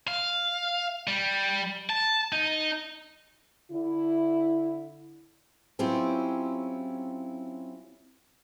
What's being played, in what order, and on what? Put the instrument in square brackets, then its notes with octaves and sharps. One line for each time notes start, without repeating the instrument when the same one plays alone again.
[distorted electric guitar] F5
G3
A5
D#4
[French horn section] D3 E4
[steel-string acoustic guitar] F#3 C4 C#4 E4 F4 G4